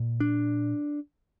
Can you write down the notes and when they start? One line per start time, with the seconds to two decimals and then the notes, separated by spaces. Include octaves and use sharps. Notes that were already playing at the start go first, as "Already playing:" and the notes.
Already playing: A#2
0.20 D4